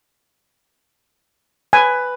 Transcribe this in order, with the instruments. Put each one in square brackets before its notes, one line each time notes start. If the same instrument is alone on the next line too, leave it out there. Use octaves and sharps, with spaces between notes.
[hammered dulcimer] B4 [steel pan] G#5